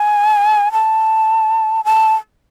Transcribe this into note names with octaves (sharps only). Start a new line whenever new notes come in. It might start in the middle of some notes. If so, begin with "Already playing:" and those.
Already playing: G#5
A5
A5